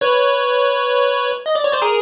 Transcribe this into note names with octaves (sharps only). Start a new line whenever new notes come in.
B4 C#5
D#5
D5
C#5
C5 D5
G#4 A#4